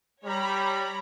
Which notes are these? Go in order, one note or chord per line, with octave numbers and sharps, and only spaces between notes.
G3 C#5 A#5 B5